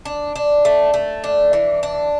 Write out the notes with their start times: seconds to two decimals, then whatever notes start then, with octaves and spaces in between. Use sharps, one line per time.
0.05 D4
0.36 D4
0.65 A3
0.94 A3
1.24 D4
1.53 E3
1.83 D4